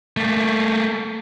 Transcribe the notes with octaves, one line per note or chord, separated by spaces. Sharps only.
A3 A#3